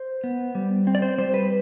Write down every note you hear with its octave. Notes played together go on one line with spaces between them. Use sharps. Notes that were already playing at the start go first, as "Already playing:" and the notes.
Already playing: C5
B3
G3
C4
D5
C5
G3 C5
B4